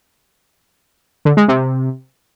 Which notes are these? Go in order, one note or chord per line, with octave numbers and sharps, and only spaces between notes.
D3
G#3
C3